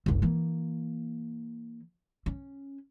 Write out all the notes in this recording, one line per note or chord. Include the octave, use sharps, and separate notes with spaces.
F#1 C2
E3 A#3
C#4